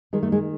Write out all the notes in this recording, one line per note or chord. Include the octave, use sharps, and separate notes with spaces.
D#3 G#3
A3
G#3